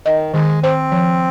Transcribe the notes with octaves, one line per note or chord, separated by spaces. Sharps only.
D#3 D#5
D#3 G#3
C4 C5
F3